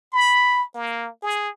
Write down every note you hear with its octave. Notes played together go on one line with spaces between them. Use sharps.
B5
A#3
G#4